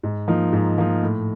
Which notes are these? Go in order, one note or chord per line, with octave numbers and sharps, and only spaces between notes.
G#2
F3 A#3 D#4
G#2
F3 A#3 D#4
A2